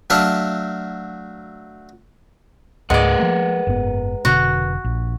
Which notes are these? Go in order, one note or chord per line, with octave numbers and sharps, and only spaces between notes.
F#3 A3 D4 E5 F5 A5
C#2 G#2 G#3 A#4 B4 D5 F#5
F3 A#3
F#1 G#2 B3
F1 B2 D3 F#4
A#1